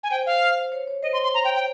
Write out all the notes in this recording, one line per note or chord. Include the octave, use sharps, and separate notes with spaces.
G#5
C5 G5
F5
C#5
C#5
C5 D#5
C6
C6
A#5
G5
G5